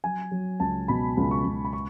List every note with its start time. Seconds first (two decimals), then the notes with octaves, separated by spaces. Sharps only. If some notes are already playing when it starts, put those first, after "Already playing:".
0.04 F#3 G#5
0.31 F#3
0.60 C#2 A5
0.88 B2 B5
1.17 C#2
1.31 C#6
1.45 C#2
1.65 B5
1.73 C#6